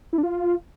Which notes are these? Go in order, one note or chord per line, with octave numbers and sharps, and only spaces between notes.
E4
D4
F4